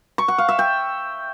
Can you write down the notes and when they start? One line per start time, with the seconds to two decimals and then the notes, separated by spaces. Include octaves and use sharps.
0.18 C#6
0.28 F#5
0.38 F5
0.49 E5
0.59 G5